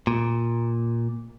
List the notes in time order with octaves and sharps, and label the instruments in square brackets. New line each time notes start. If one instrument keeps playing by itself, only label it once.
[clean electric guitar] A#2